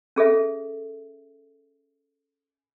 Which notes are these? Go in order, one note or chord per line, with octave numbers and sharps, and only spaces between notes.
C#4 G#4 A4 E5